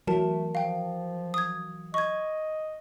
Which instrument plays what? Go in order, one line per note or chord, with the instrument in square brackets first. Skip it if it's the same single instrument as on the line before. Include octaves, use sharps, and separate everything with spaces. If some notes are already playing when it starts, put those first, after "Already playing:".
[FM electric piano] E3 F#3 [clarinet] A3 [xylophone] A#4 A5
[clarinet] F3 [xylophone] F5 G5
[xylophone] D#6 G#6
[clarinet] D#5 [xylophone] C#6 G#6